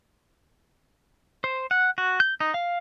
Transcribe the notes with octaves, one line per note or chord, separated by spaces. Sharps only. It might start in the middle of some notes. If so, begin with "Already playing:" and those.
C5
F#5
F#4
G6
D#4
F5